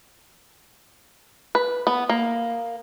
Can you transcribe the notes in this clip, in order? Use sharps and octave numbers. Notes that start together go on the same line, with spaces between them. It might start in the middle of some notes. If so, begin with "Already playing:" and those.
B4
B3
A#3